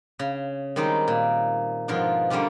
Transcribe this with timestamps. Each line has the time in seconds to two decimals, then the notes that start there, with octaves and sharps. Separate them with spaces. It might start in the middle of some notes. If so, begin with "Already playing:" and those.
0.19 C#3
0.76 D#3 G3 G#3 C4 D#4
1.08 A#2
1.88 G#2 B2 F3 F4 A#4 C6
2.30 D3 G3 A#3 C#4 F4 G4